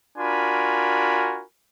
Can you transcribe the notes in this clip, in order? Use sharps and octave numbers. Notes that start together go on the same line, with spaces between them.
D4 F4 F#4 A#4 G#5 B5